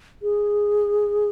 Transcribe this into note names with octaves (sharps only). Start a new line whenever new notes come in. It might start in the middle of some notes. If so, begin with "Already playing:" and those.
G#4